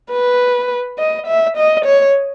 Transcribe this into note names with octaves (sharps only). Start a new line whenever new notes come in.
B4
D#5
E5
D#5
C#5